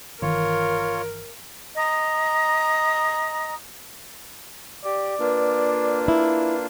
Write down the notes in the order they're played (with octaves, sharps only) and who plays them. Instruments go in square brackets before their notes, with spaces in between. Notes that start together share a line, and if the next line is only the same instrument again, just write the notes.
[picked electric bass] G1 D#3 E3 [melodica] F4 C#5 [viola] A#4
[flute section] D#5 A#5 D#6
[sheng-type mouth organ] G4 [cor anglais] D5
[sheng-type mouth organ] A#3 D4 F4 [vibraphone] B4
[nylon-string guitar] E4